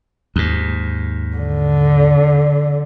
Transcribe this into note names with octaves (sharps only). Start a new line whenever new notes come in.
D#2 G#2
D3